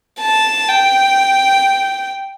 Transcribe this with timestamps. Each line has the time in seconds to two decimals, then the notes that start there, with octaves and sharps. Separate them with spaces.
0.20 A5
0.68 G5